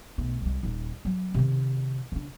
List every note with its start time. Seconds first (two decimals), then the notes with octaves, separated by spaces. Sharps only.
0.18 B1 A3
0.41 C2 G#3
0.63 D#1 D#4
1.05 F#3
1.34 C3 D#3
2.12 C#3 D4